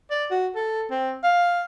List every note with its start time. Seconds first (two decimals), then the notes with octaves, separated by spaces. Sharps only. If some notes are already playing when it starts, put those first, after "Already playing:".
0.11 D5
0.31 F#4
0.56 A4
0.91 C4
1.24 F5